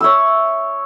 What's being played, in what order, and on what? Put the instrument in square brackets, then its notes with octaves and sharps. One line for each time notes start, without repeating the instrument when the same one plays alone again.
[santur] C#5 E5 E6